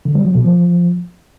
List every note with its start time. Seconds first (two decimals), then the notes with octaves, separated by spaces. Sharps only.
0.05 D3
0.15 G3
0.25 F#3
0.35 B2
0.45 F3